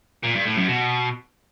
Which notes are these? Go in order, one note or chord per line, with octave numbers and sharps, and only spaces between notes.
A#2
G2
A2
F#2
B2